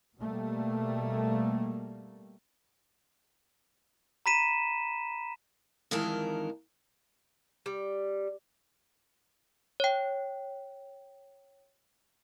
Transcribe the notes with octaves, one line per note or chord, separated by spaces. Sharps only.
B2 G3 A3 A#3
A#5 B5 B6 D#7 E7
F2 D#3 E3 G#3 A#4 A5
G3
C#5 G5